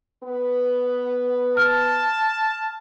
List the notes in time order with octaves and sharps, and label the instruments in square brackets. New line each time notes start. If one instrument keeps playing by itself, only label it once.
[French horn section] B3 B4
[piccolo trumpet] A5 [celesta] F6